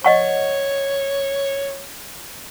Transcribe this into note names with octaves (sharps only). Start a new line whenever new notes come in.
C#5 D#5 F#5 C#6